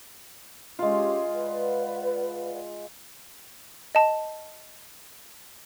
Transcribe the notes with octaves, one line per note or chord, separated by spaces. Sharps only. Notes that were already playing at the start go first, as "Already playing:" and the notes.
G#3 C#4 F4 G4
B4 D5 F#5
D#5 A5